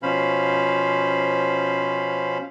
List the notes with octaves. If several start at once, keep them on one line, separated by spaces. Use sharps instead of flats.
B2 F3 C#4 C5 F5 B5